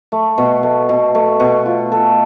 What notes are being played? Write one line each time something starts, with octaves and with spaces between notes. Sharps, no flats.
A3
B2
A3
B2
A3
B2
F4
A4